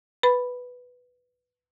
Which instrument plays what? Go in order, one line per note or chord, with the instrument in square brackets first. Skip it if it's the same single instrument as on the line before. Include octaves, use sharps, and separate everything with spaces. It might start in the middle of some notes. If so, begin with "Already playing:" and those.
[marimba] B4 B5